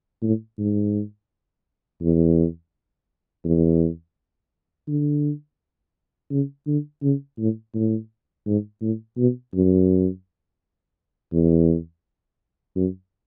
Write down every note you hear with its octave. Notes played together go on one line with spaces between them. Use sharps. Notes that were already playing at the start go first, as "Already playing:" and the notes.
A2
G#2
E2
E2
D3
C#3
D3
C#3
A2
A2
G#2
A2
B2
F#2
E2
F#2